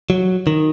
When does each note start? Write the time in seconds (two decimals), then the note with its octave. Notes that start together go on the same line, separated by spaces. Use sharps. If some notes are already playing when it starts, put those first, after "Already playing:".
0.10 F#3
0.47 D#3